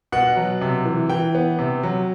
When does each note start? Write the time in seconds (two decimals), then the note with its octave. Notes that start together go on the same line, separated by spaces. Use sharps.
0.12 B2 F#5
0.37 F#3
0.61 C3
0.85 E3
1.09 E3 G5
1.35 B3
1.59 C3
1.83 F#3